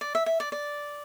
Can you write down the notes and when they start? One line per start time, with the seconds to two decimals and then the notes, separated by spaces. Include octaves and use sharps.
0.01 D5
0.15 E5
0.26 E5
0.40 D5
0.52 D5